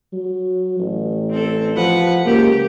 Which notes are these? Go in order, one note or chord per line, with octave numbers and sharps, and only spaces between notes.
F#3
A1
C4 A4
F3 B4 F#5
C#2 A#3 G4